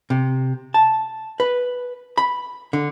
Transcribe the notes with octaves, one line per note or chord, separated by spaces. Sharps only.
C3
A5
B4
B5
D3